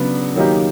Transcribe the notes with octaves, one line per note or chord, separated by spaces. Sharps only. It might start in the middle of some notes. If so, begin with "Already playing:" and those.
Already playing: C#3 F#3 B3 D4
D#3 F#3 A#3 D#4 G4